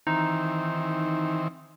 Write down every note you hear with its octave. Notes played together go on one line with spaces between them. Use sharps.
D#3 E3 C4 D#4